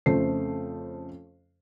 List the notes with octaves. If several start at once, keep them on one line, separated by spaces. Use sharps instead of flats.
F2 C#3 A3 C5 C7